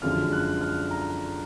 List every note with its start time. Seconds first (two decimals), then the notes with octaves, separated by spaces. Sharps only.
0.02 F#2 D3 F3 G#3 F6
0.32 F#6
0.61 F6
0.91 A#5